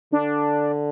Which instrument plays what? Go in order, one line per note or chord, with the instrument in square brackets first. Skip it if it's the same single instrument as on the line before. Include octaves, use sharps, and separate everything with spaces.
[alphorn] D3 [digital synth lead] D4